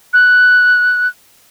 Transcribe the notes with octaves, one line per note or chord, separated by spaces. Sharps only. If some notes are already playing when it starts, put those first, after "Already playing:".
F#6